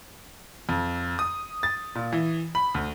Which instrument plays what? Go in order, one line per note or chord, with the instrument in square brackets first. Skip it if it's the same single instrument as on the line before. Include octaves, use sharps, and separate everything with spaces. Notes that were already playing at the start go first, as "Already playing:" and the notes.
[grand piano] F2
D#6
A6
A#2
E3
B5
D2